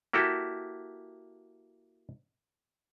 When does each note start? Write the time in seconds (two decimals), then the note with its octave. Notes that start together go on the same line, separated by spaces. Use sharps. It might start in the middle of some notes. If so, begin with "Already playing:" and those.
0.13 A#3 E4 F#4 G4 A4